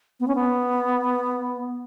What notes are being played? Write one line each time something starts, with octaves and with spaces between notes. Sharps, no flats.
B3
C#4
B3